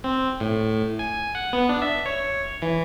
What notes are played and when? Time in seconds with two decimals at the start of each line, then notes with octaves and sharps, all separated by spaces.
0.04 C4
0.40 A2
0.99 G#5
1.35 F#5
1.53 B3
1.69 D4
1.82 E5
2.06 C#5
2.62 E3